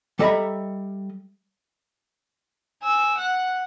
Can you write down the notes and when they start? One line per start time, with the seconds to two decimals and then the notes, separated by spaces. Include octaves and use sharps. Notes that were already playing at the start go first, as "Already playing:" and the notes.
0.19 G3 A4 D#5 E5 A#5 B5
2.83 G#5 E6
3.18 F#5 F#6